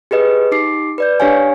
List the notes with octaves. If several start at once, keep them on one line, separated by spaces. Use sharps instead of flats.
G4 G#4 B4 D#5
D#4 G4 D6 C7
B4 D5 G6
D4 G4 C#5 F5 G#5